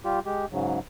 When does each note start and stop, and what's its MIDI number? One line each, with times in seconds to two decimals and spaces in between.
0.05 0.19 55
0.05 0.19 65
0.05 0.19 67
0.26 0.45 56
0.26 0.45 67
0.52 0.79 44
0.52 0.79 49
0.52 0.79 54